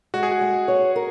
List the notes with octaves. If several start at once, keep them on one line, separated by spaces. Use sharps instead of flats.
G#3 F#4
G#4
F#4
G#3
C#5
A#4